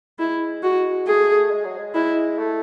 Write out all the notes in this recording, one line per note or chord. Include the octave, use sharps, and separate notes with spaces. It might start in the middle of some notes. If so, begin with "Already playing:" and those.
G#3 E4
G#3 F#4
A3 G#4
G#3
F#3
G#3
G#3 E4
A3